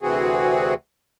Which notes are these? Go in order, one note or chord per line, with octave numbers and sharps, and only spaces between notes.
D2 C3 E3 C4 F#4 G#4